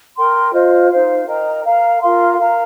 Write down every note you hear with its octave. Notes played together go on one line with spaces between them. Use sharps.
A#4 G5 C6
F4 C5 D#5
D#4 C5 F5
A#4 D#5 G5 A#5
A#4 F5 A#5
F4 A#4 F5 C6
A#4 F5 A#5